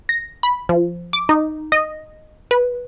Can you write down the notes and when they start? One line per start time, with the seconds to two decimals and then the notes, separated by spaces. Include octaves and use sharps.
0.09 A#6
0.43 B5
0.69 F3
1.13 D6
1.29 D#4
1.72 D#5
2.51 B4